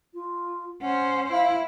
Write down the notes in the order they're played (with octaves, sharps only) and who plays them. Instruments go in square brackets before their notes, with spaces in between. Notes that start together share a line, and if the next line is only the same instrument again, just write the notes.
[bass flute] F4
[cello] C#4 C5 [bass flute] F#5
[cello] E4 [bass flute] E5 [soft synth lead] F5